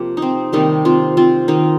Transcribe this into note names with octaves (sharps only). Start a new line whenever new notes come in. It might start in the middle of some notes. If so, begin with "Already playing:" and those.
Already playing: C3 F3 A#3 G4
D#4
C4
C3 D#3 G3 A#3 D#4
C4 F4
C4 F4
D#3 A#3 D#4